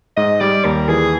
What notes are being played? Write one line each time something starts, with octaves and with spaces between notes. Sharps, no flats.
G#2 D#5
G3 D5
D#2 A#4
E3 G#4